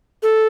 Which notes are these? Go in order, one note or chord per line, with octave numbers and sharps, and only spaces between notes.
A4